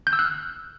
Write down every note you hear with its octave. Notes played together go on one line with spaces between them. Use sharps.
G6
E6
F#6
F6